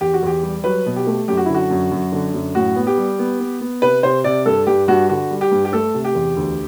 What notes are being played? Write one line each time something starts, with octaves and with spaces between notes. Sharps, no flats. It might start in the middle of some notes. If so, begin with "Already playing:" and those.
E2 G4
F#4
E2 G4
G3
F#3 B4
B2
G4
A3
F#2 G4
F#4
D3 E4
F#4
F#2
F#2
D3
F#2
A2 F#4
B3
G4
G3
B3
B3
B3
C3 B4
C3 C5
C3 D5
G2 A4
G2 G4
G2 F#4
D3 F#4
G3
G4
G2
G4
A3 A4
C3
G4
E2
D2